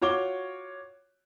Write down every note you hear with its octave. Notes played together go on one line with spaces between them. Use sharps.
F4 F#4 C#5 D6 G7